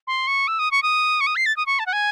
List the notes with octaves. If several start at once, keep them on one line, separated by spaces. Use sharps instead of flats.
C6
C#6
E6
D#6
C#6
D#6
C#6
D#6
C7
A6
D#6
C#6
A5
F#5
G#5